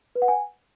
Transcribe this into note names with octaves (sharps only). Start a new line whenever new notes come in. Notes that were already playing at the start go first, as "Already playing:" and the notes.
B4
F#5
G#5